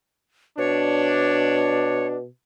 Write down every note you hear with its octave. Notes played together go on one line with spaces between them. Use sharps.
B2 D4 C#5